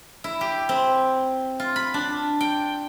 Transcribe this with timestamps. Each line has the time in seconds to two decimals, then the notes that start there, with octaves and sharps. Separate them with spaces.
0.24 E4
0.41 G4
0.69 C4
1.60 F4
1.76 B5
1.94 D4
2.40 G5